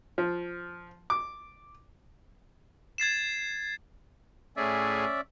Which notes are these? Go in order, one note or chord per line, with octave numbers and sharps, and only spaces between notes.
F3
D6
G#6 A6 C7 E7
A2 C#4 G#4 D5 E5